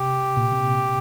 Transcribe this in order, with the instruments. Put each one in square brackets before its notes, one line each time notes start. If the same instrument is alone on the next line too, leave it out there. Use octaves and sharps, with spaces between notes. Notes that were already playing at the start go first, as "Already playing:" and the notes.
Already playing: [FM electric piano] C3 [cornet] G4
[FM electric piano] A#2
C3